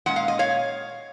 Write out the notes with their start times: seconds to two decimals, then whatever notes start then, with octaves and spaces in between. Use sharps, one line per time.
0.06 A#2 G#3 C#4 F#5
0.16 F5
0.28 D#5
0.39 C#5 F5